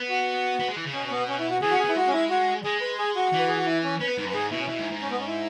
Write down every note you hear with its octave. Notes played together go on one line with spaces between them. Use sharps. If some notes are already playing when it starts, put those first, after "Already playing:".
Already playing: B3
F#4
B3
G#3
E3
C#3
B2 C#4
C#4
B3
C#4
E4
F#4
E3 G#4
C#4 F#4
G#4
B3 E4
G#3 F#4
C#4
E4
F#4
G#3 G#4
B4
G#4
F#4
E3
B4
G#4
F#4
E4
C#4
C#4 B4
B3
G#2
F#2
B4
G#2 G#4
B2 E4
C#4
B2 E4
G#2
G#2
C#4
B3
C#4
E4